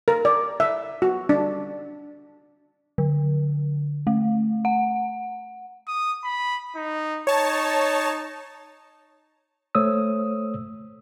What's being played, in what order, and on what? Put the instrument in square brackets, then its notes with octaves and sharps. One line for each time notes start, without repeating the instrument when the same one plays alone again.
[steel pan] A#4
D5
E5
F#4
D4
[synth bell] D3
A3
F#5
[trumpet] D#6
B5
D#4
[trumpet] D#4 [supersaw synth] C#5 A5
[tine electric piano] A3 C5 C#5 D#6 E6